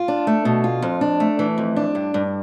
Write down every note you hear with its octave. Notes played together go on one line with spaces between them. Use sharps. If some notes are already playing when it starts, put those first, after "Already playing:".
Already playing: F4
D4
A3
B2
F4
F2
D4
A3
E3
F2
D4
G2
G2